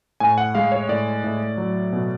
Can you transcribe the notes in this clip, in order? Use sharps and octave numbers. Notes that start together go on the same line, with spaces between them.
A2 G#5
F#5
G#3 F5
C#5
A2 D5
A2
F#3
B2